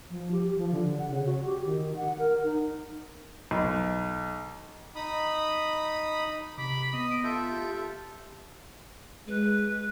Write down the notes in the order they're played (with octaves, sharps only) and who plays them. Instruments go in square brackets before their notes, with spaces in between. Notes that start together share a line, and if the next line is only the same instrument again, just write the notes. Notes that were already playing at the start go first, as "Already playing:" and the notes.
[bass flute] F3
G4
F3
D3
F#5
C#3
F#4
G4
D#3
F#5
A#4
D#4
[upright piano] B1
[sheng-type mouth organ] D#4 B5 D#6
[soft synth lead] C3 [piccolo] B5 [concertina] D6
[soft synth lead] B3 [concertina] D#5 D#6
[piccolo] D7
[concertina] F4 A4 E5 [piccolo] G6
[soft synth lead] G4
[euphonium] G#3 [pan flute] B4